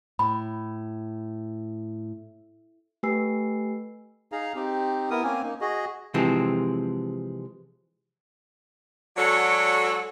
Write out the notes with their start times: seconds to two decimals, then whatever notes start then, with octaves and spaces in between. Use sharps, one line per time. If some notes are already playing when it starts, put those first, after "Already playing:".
0.19 A2 B5
3.03 A3 G4 B4 G#5 E6 C7
4.32 D#4 G#4 F5 A#5
4.55 C4 D#4 G4
5.10 B3 E4 A#4 D#6
5.24 A#3 C4 C#4 G#5
5.43 A#3 D#4
5.61 F#4 G#4 D#5
6.14 C3 E3 F3 G#3 C4
9.17 F#3 G#3 F#4 A4 C#5 D5